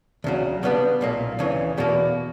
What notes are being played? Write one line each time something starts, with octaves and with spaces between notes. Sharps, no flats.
D2 C#3 F#3
C#3 G3 B3 D4
B1 A#2 A#3
D2 C#3 E3
E2 B2 A#3